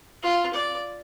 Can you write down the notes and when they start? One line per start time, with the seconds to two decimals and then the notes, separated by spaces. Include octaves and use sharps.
0.22 F4
0.53 D5